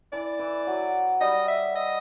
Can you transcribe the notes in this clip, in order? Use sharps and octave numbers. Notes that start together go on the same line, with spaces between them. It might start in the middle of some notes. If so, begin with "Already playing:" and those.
E3 D5
E3
F#3
G3 D#5
E5
D#5